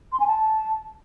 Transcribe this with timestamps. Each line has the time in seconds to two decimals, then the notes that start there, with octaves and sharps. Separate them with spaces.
0.12 C6
0.20 G#5
0.27 A5